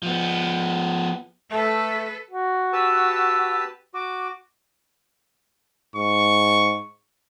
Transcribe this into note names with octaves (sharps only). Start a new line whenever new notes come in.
F3 B3
A3 A4 B4
F#4
G4 B4 A5 E6
F#4 D6
G#2 C#6